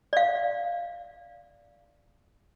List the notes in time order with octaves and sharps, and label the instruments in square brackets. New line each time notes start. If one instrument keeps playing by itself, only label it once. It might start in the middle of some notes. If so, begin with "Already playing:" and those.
[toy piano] D5 F5